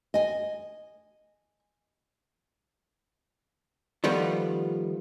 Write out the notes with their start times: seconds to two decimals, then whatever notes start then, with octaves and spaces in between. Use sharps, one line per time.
0.14 D#5 G#5
4.04 D#3 F3 G3 A3 B3 F4